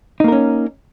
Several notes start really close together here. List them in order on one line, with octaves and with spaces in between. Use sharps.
D#4 A#3 A#4 C#4